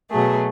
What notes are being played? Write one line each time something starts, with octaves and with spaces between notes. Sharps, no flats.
B2 F#3 A3 G#4